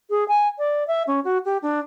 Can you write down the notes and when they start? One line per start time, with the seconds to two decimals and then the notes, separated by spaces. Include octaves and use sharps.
0.10 G#4
0.28 G#5
0.58 D5
0.87 E5
1.07 C#4
1.24 F#4
1.45 G4
1.62 D4